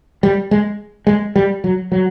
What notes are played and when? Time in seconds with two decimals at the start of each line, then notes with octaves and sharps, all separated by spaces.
0.23 G3
0.51 G#3
1.07 G#3
1.36 G3
1.64 F#3
1.92 F#3